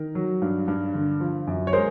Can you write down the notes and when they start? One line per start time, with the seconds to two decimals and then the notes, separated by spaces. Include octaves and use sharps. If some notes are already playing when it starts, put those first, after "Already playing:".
Already playing: D#3 A#4
0.15 F#3
0.42 G2
0.68 G2
0.94 D3
1.20 F3
1.47 F#2
1.67 C#5
1.73 G#3 A#4 C5